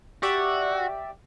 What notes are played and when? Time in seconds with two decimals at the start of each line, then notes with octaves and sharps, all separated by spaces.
0.23 F#4 G4 D5 E5